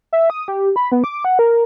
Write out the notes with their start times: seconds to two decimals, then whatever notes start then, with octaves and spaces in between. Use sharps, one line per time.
0.13 E5
0.30 D#6
0.48 G4
0.76 B5
0.92 B3
1.04 D6
1.25 F#5
1.39 A#4